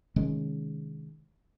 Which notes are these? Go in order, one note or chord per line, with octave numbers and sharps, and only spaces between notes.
C3 D#3 G#3 C#4